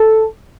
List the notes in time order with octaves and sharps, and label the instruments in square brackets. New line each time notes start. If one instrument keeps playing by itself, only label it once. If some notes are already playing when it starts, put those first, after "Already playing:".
Already playing: [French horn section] A4